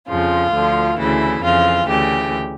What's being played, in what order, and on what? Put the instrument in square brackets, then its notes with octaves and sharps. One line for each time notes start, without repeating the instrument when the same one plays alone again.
[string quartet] F2 C#3 F3 F4
D2 D3 F3
D2 C#3 E3 E4
F2 C#3 E3 F4
D2 C#3 E3 G4